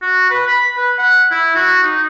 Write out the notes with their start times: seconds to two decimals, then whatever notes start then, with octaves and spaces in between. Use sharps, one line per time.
0.02 F#4
0.30 B4
0.48 B5
0.77 B4
0.99 F#5
1.31 E4
1.56 F#4
1.83 D#4